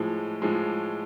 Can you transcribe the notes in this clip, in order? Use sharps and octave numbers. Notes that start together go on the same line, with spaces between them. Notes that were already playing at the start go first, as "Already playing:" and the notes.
Already playing: A2 F3 G#3
A2 F3 G#3